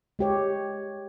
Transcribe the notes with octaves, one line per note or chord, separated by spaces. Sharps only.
G#3 G4 C#5